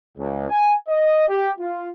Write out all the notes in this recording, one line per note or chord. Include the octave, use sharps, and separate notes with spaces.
C#2
G#5
D#5
G4
F4